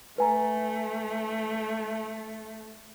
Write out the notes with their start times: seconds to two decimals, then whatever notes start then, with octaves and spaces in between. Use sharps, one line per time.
0.18 A3 B4 G#5 A#5